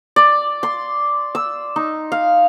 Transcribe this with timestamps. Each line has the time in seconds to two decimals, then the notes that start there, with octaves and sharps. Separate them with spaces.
0.16 D5
0.63 C6
1.35 E6
1.76 D#4
2.12 F5